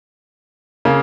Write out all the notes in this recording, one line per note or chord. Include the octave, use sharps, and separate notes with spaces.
C#3 A#3